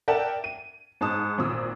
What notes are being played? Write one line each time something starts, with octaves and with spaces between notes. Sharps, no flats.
A#4 D5 E5 F#5 G5 A5
D#7
G#2 A5 D#6
G#1 A#2 D#6 E6